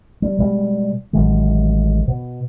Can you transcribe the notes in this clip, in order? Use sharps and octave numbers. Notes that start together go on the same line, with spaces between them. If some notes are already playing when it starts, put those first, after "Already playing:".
G3
B2 G3 G#3
A1 D#3 F#3 G#3
B2